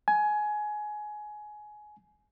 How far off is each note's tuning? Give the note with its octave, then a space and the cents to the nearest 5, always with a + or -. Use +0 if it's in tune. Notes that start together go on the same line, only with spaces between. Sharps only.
G#5 +20